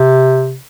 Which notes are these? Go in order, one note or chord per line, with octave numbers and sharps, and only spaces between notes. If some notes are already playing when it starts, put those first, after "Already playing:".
Already playing: C3